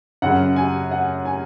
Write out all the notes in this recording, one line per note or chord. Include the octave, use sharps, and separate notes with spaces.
F#2 C#3 F#5
G#5
F#5
G#5